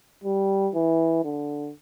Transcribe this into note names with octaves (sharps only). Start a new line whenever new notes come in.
G3
E3
D3